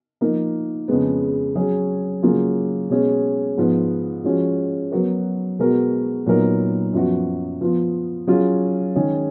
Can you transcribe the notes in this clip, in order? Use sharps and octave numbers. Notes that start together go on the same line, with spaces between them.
F3 A#3 D#4 A#4
F2 C#3 G#3 B3
F#3 C#4 G#4
C#3 F#3 A#3 F4 G#4
B2 G#3 C#4 G#4
G#2 F3 B3
F3 G#3 C#4 F#4
F#3 B3 F#4 A#4
B2 G#3 B3 F#4 A#4
A#2 F#3 B3 D#4 A#4
F#2 F3 B3 F#4
F3 B3 F4
F#3 C#4 F4 G#4
D#3 G#3 C#4 G#4